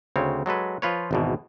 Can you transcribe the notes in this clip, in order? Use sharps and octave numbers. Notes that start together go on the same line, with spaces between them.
D2 C#3 C4 C#5
F#3 G#3 A4 B4
F3 F4 B4 C#5
G#1 E2 B2